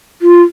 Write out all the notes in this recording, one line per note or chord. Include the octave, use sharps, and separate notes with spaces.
F4